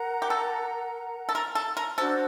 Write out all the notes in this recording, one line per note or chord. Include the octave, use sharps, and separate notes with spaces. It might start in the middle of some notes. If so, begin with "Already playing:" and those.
Already playing: A#4 F#5 A#5
G4
A4
A4
A#4
A4
A#4
D4 F#4 A4 C5